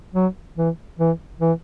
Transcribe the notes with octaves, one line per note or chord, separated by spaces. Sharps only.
F#3
E3
E3
E3